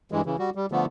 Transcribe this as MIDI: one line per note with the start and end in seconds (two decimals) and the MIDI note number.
0.12 0.21 43
0.12 0.21 52
0.12 0.21 56
0.26 0.36 49
0.26 0.36 52
0.39 0.50 55
0.39 0.50 66
0.55 0.66 55
0.72 0.85 50
0.72 0.85 53
0.72 0.85 57
0.72 0.85 59